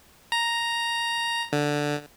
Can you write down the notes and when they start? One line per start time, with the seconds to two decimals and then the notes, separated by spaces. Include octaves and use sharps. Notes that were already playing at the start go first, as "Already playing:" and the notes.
0.32 A#5
1.53 D3